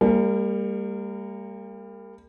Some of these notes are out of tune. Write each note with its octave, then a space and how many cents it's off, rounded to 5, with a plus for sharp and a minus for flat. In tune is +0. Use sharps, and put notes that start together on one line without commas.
G3 +30 A#3 -25